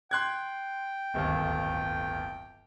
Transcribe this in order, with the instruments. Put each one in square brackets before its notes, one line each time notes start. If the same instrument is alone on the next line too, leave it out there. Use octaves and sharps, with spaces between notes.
[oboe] G5 [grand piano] C6 F#6 G#6
[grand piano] D1 G1 D#2